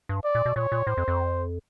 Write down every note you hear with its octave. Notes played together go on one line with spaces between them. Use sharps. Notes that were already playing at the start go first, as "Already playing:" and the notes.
G2
D5
A#2
B2
A#2 C#5
A#2
A2 C5
F2
F2